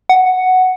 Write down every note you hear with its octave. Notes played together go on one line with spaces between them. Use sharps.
F#5